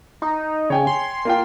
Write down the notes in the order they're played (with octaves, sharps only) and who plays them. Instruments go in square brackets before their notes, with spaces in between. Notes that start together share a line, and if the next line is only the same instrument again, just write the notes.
[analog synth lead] D#4
[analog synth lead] C#3 [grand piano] C#5 G5 G#5
[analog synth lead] C6
[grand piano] A#3 F4 G5